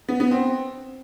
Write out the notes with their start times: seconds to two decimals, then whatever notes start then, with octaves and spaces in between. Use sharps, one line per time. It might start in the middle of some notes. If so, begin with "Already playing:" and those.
0.09 B3
0.20 B3
0.31 C4